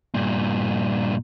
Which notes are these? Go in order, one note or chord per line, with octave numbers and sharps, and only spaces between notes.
G2 A#2